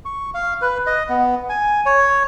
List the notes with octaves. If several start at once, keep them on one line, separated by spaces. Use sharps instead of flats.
C#6
F5
B4
D#5
B3
G#5
C#5